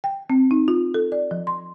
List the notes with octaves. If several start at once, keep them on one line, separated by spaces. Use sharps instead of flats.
G5
C4
D#4
F4
A4
D5
F3
C6